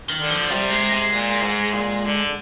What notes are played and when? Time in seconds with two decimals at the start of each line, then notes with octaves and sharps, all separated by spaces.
0.09 D#3
0.20 D3
0.30 F3
0.51 C3 G3
0.71 G#3
0.92 G#3
1.12 A#2
1.42 G#2
1.73 A#2
2.05 D3